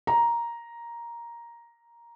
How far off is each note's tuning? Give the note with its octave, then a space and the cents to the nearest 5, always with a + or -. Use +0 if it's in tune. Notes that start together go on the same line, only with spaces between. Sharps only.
A#5 +5